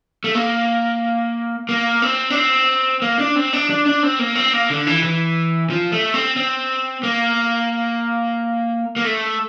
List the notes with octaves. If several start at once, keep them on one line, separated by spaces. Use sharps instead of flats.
A3
A#3
A#3
C4
D4
C4
A#3
D4
C4
D4
D4
D4
C4
A#3
C4
A#3
D3
E3
E3
F3
A3
C4
C4
A#3
A#3
A3